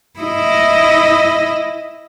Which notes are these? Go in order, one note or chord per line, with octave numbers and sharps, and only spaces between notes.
E4 D#5